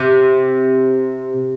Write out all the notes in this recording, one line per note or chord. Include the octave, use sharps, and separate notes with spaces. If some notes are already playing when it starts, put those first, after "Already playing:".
Already playing: C3